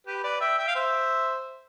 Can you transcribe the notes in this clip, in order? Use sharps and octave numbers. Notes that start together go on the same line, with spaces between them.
G4 B4
B4 D5
E5 G5
E5 G5
F5
C5 E5